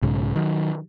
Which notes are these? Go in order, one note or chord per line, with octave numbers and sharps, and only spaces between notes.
B1 G#2 C#3
D#3 F#3